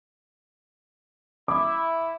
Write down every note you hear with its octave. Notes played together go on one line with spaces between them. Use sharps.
E4 D6